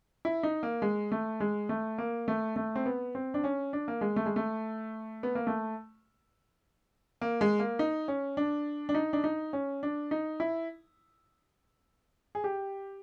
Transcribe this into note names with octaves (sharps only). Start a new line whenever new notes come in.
E4
D#4
A#3
G#3
A3
G#3
A3
A#3
A3
A3
C4
B3
C4
D4
C#4
D4
A#3
G#3
A3
G#3
A3
B3
A#3
A3
A#3
G#3
A#3
D#4
C#4
D4
D4
D#4
D4
D#4
C#4
D4
D#4
E4
G#4
G4